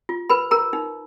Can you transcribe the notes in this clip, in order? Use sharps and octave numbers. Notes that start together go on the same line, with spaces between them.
F4
A#4 B4 B5
A#4 A#5
D#4